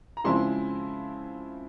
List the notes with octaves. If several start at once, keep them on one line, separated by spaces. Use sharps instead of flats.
A#5
C#3 F3 G#3 C4 E4 C6